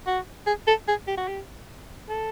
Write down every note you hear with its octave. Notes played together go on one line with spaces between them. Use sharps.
F#4
G#4
A4
G#4
G4
F#4
G4
A4